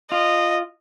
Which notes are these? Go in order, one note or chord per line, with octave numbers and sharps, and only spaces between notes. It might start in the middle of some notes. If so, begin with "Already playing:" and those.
F4 D#5